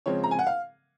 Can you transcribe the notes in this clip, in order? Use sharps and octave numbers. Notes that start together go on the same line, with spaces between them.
C#3 F3 G#3 C4 C#5
A#5
G#5
F#5
F5